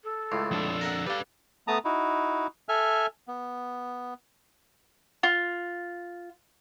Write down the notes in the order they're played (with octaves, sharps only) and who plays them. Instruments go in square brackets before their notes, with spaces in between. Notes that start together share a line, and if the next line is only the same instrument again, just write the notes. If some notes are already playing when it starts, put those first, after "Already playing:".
[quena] A4
[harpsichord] C#2 A2
[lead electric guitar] F2 D4
[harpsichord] A#4 E5 F#5
[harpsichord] G3 D4 [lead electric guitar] B4 F5
[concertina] A3 B3 A5 A#5 D#6
D#4 E4 F#4
A4 E5 G#5 F6
B3
[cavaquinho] F4